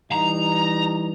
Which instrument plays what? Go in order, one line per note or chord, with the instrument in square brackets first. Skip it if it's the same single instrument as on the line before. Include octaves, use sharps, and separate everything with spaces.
[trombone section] E3 G3 D#4 [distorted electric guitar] A#5